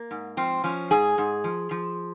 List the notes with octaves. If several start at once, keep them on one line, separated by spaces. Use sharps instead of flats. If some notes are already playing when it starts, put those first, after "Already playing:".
Already playing: A#3
G#2
F3 C4
F3 C#4
G#2 G#4
G#2
F3
F3